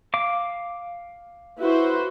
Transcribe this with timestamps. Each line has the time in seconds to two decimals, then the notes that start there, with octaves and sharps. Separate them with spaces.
0.14 F5 D6
1.59 E4 F#4 B4 C5